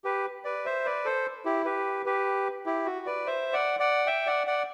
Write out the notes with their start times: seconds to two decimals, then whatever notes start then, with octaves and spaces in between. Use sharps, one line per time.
0.04 G4 B4
0.45 B4 D5
0.65 C5 E5
0.85 B4 D5
1.05 A4 C5
1.45 E4 G4
1.65 G4 B4
2.06 G4 B4
2.66 E4 G4
2.86 F#4
3.06 B4 D5
3.26 C5 E5
3.53 D5 F#5
3.80 D5 F#5
4.06 E5 G5
4.27 D5 F#5
4.47 D5 F#5